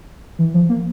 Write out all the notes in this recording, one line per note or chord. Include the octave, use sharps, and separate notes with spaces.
E3
F3
A#3